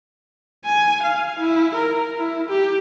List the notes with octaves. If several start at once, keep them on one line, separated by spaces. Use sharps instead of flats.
G#5
F5
E4
A#4
E4
G4